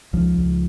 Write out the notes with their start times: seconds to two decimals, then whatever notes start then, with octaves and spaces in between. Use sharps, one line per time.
0.13 C#2 F3
0.38 C#2